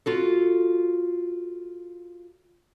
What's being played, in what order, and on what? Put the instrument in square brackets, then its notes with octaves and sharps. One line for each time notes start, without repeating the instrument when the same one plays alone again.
[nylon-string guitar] F4 F#4 A4